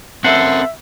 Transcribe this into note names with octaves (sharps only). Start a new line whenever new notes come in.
C4 C#4 A4 A#4 C5 E5 F#5